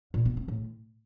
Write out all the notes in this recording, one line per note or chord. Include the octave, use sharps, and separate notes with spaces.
A#2
B3
C4
A2